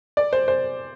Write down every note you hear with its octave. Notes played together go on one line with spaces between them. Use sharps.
D5
C5
C5